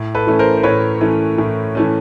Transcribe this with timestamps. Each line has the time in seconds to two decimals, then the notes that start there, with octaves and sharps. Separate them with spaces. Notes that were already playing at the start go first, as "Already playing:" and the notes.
Already playing: A2
0.15 A4 B4
0.27 E3 A3 C#4
0.39 A#4 C5
0.57 C5
0.63 A2 B4 C#5
1.01 E3 A3 C#4
1.38 A2
1.75 E3 A3 C#4